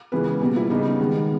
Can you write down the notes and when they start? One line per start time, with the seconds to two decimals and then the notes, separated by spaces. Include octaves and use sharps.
0.12 C#3 E3 G#3 B3 B4
0.41 B2 G3 A#3 G#4
0.56 E4
0.70 C#3 G3 B3 D#4
0.99 D#3 G#3 B3